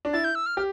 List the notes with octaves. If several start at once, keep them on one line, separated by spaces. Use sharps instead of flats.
D4
E4 A6
G6
E6
F6
G4 F6